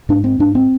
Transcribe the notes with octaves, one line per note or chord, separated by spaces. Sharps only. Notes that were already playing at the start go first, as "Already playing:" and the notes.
G#2 D4
C4
G#2 D4
C4